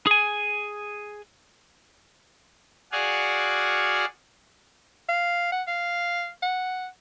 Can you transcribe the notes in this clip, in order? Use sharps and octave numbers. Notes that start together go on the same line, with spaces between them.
G#4 G#5
F#4 G#4 D5 F5 F#5 G#5
F5
F#5
F5
F#5